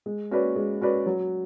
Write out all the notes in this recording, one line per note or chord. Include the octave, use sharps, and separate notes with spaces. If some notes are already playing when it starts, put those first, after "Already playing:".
G#3
C#4 F#4 B4 D5
G#3
C#4 F#4 B4 D5
F#3